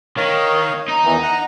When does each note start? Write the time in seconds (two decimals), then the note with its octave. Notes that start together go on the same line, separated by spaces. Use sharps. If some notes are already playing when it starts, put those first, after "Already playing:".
0.17 D#3 C#5 F5
0.88 D#4
1.04 E2 D#3 E3
1.22 F#5 A#5